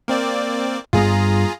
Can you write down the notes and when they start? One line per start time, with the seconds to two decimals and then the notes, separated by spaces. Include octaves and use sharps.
0.08 A#3 C4 D5
0.93 G2 B3 F4 G#4 A#5